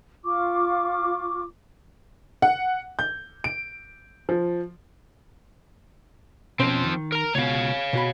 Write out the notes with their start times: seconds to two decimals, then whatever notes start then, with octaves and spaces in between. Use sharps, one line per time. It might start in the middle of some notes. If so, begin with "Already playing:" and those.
0.25 F4 C#6 D6
2.42 F#5
2.99 G6
3.44 D7
4.29 F3
6.60 B2 F3 C4 C#4 C5
6.84 D#3
7.12 A#4 A#5
7.35 C#2 B2 C#5 F5
7.93 B2 F#4 B5